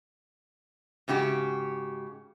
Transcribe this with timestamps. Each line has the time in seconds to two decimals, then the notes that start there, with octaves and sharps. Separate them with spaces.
1.08 G#2 C#3 F#4 G4